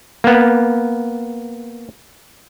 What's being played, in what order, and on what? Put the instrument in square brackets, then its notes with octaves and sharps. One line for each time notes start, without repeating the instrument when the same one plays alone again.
[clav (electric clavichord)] A#3 B3